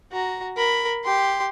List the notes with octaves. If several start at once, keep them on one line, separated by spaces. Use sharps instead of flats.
F#4 A#5
A#4 B5
G4 C6